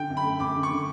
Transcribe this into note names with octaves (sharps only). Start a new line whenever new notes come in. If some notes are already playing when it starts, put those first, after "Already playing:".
Already playing: D3 G5
F#2
B5
A3
F#2 D6
D3
C#6
D3